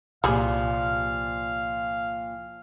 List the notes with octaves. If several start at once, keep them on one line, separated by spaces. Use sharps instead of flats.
C2 A#2 F3 G3 G#4 F5